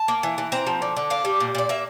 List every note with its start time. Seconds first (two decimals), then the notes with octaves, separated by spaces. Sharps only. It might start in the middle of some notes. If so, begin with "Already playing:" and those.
Already playing: A5
0.08 A#3
0.23 E3
0.38 E3
0.52 C4 A#5
0.67 F3
0.82 D3
0.97 D3
1.10 D4 F5
1.25 G3
1.40 A#2
1.55 A#2 D5
1.69 A#3 E5